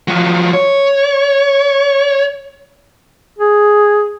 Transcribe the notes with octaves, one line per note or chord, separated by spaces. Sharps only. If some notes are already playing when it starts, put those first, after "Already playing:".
F3 F#3
C#5
G#4